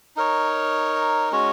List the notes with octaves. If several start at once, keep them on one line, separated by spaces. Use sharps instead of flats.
D#4 A#4 C#5
G#3 C#4 F#4 C#5